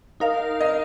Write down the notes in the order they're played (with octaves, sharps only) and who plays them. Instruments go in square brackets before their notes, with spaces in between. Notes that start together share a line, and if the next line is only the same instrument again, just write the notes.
[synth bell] D#4 A#4 F5
[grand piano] D#5